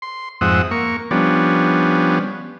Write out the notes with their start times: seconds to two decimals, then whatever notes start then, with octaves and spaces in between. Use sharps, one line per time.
0.02 C6
0.41 F2 G#2 C4 E5 F#5 D#6
0.71 A#3 C#6
1.11 F3 G3 B3 C#4 D4